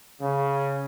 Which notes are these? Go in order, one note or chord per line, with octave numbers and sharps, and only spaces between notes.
C#3